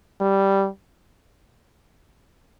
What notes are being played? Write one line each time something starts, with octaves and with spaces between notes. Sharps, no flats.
G3